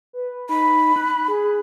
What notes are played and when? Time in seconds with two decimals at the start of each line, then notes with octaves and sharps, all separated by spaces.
0.13 B4
0.49 D#4 B5
0.96 F#6
1.28 G#4